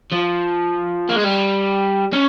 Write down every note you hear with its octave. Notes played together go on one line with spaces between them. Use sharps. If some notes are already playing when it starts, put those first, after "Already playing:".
F3
A#3
G#3
G3
C#4